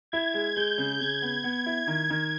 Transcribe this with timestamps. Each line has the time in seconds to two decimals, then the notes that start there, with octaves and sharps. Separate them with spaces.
0.12 E4 G#6
0.34 G#3
0.56 G#3 G6
0.78 C#3
1.00 C#3 G#6
1.22 B3
1.44 B3
1.66 E4
1.87 D#3
2.10 D#3